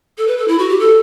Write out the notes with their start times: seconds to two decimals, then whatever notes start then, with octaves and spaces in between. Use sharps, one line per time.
0.18 A4
0.27 B4
0.38 A4
0.48 E4
0.58 F#4
0.69 G4
0.79 A4